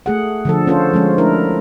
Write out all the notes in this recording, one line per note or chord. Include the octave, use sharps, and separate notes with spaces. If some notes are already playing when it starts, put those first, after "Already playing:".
A3 G#4 F#5
D3 F3 A4
C#4 F4 A4 C5
F3 G#3 C#4
A3 D4 E4 A#4